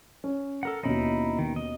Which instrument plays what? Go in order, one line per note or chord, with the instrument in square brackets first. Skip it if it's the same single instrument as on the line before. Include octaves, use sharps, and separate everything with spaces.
[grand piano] C#4
[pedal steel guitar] A4 A#4 F#5
[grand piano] D#2 B2 C#4 [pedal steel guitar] D#4 E4 B5
[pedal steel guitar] D#3
D#5